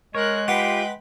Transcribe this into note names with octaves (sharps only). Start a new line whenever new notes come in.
G#3 A#4 C#5 F#6
F4 G4 B4 F#5 G5 B5